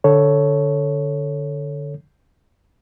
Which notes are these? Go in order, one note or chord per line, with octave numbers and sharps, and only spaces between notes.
D3 A4 C#5